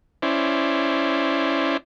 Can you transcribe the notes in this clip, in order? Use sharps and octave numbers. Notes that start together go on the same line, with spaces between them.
C#4 E4 C5 D5